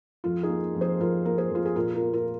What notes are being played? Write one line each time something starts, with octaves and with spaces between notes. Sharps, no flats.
F2 F4
D#4 G#4
A#3
F2
G#4 C5
F2 F4 A#4
A#3 A#4
G#4 C5
F2
F4
G#4
A#2 F4 A#4
F4 A#4
A#3
F4 A#4